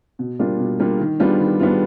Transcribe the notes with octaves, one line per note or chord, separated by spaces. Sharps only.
B2
G3 A#3 D4 F4
B2
G3 A#3 D4 F4
D#3
G3 B3 D4 F4
D#3
G3 B3 D4 F4